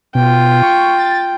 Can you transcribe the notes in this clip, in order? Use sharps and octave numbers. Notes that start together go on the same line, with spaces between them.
B2 F4 G5
C#6
A6